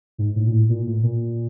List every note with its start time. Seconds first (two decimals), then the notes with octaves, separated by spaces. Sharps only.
0.18 G#2
0.36 A2
0.47 A#2
0.52 A2
0.69 A#2
0.86 A2
1.03 A#2